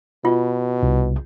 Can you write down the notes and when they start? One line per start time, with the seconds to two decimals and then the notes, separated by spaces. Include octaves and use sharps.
0.25 B2 F4
0.83 C2